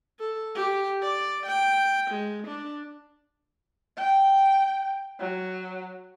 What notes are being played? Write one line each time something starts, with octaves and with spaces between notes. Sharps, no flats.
A4
G4
D5
G5
G#3
D4
G5
F#3